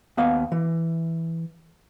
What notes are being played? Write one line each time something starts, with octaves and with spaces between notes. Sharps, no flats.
D#2 B3 F5
E3